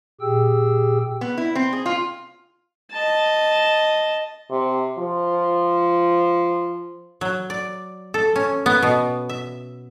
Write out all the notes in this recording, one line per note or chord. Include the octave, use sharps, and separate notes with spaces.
A#2 G4 G#4 G5 E6
B3
E4
C4
G#4
F4
D#5 A5
C3
F3
F#3
D5
A4
C#4
B3
B2
E5